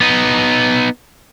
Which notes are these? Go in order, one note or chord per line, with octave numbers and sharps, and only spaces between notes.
B3 D#4